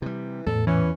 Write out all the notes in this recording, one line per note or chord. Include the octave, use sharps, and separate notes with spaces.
C3 E3 G3
E2 A2 A4
E3 C#4